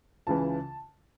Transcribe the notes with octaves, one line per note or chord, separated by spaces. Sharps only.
C#2 C#3 E3 A5